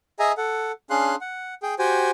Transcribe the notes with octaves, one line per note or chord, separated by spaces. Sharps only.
G#4 D#5 E5 G#5 A#5
A4 F#5
C#4 D4 G#4 F5 C6 F#6
F#5
G#4 G5
F#4 G4 C5 G5 G#5